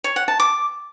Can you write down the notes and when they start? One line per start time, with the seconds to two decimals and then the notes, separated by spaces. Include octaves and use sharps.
0.04 C#5
0.16 F#5
0.28 A5
0.40 D6